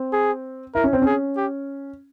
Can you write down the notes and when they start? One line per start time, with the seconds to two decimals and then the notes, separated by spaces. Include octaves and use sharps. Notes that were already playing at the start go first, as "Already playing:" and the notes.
Already playing: C4
0.13 G#4
0.75 E4 A#4
0.84 C#4
0.93 C4
1.02 C#4 G#4
1.37 G4